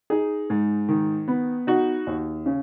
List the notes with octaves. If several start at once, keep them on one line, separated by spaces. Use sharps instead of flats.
D#4 G#4
G#2
D#3
B3
D#4 F#4
D#2
C#3